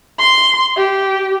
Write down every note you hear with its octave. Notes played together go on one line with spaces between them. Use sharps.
C6
G4